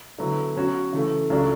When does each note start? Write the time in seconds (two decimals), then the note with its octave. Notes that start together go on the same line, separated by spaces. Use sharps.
0.18 D3 F#3 B3 E4
0.56 F#3 C#4 F#4 C#5
0.93 C#3 E3 A3
1.30 C#2 C#3 F#3 A3 D4